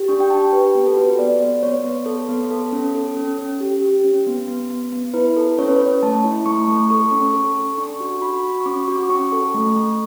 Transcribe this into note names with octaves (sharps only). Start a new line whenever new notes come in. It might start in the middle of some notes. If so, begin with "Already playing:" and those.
Already playing: G4
D4 C#6
G5
G4 A5
G4 B4
B3 B4
A4
F#4 B4
B3 D5
B3
B3 C#5
B3
A4
B3
A4
C#4
A4
C#4
C#4
G4
G4
C#4
B3
B3
B3
B3
E4 B4
A4
C#4 C#5
B4
C#4 C#5
A3 A5
E4
A3 C#6
A3
A4 C#6
C#4
A4
A4
D4 C#6
F#4
F#4 B5
F#4
C#6
C#4 D6
F#4
D6
C#4 C#6
A4
A3
A3